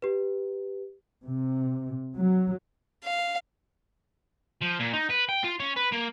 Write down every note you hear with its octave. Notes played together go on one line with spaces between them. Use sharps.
G4 B4
C3
F#3
F5
F3
A#2
D#4
B4
G5
F4
C#4
B4
A#3